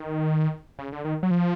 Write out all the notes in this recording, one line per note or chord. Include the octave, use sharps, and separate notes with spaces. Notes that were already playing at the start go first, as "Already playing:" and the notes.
Already playing: D#3
C#3
D3
D#3
F#3
F3